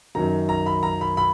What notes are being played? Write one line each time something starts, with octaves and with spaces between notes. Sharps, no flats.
F#2 D#3 F#3 A#5
A#5
B5
A#5
B5
B5